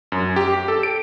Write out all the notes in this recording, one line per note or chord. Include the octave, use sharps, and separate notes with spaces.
F#2
G4
A4
D7